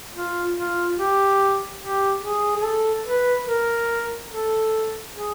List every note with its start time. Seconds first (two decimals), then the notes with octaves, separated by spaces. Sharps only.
0.15 F4
0.57 F4
0.98 G4
1.81 G4
2.22 G#4
2.56 G#4
2.63 A4
3.06 B4
3.46 A#4
4.30 A4
5.12 G#4